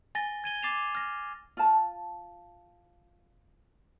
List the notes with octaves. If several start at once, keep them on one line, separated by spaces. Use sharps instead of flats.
G#5 A6 A#6 G7
G#6 D#7 G7
D6 A6 C7 E7 F7
F6 A#6
F4 A5